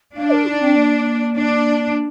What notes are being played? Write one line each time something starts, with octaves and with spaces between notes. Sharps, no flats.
D4 F5
A#4
D#4
C4
A#3
D4